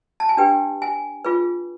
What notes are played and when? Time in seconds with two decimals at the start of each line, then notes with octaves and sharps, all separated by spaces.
0.20 A5
0.29 G#5
0.37 D4 G4 B4 G5
0.82 G#5
1.25 F4 G#4 B4